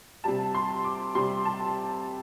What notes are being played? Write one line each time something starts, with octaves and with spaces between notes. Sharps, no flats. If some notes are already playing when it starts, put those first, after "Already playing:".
C3 G3 A5
C6
D6
C3 G3 C6
A5